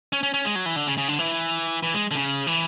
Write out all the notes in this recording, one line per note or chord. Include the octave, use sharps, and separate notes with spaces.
C#4
C#4
C#4
G#3
F#3
E3
D3
C#3
C#3
D3
E3
E3
G#3
D3
C#3
E3